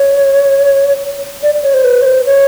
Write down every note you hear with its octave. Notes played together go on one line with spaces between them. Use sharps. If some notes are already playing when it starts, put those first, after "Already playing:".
Already playing: C#5
D5
C#5
C5
B4
C#5
C5
C#5